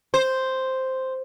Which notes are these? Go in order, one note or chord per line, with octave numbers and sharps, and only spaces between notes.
C5